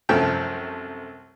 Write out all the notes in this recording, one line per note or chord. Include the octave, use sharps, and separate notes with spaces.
C2 F#2 F3 A3 G5